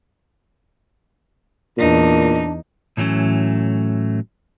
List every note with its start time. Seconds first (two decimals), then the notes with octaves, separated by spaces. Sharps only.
1.78 E2 A#2 D4 D#4
2.97 A2 E3 F#3 A3 C#4